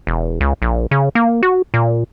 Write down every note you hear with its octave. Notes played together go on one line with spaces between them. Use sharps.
E1
C#2
A#1
C#3
A#3
F#4
A#2